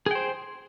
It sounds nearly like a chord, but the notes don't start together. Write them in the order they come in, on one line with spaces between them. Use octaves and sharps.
G#4 G5 C5